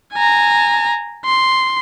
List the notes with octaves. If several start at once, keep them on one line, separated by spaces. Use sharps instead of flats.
G#5 A#5
C6